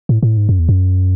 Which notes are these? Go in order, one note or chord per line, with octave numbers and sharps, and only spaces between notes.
A2
A2
G#2
F#2
E2
F#2